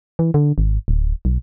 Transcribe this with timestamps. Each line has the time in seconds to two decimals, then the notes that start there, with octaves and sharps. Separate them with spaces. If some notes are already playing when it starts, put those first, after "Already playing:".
0.19 E3
0.34 D3
0.58 G#1
0.88 D1
1.25 B1